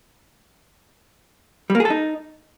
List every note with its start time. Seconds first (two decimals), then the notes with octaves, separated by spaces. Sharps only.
1.70 G3
1.75 A#3
1.80 G#4
1.85 A4
1.90 D#4